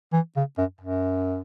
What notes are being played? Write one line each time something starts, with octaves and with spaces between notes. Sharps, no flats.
E3
C#3
F#2
F#2